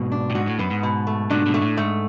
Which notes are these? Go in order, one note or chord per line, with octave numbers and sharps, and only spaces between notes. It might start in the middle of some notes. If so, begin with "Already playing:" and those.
Already playing: G#2 B2
D4
A2
G#2 F#4
A2
F#2 B3
G#2
B2
A3
G#2 B2 D4
G#2 B2
A3
A2
G#2 A3